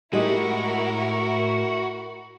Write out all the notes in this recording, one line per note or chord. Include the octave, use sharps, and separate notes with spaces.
A2 G#3 D#4 E4 F#4 G4 A#4